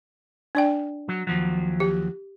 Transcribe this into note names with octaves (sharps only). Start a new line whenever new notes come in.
D4 D5 G5
F#3
D#2 F3 F#3
G4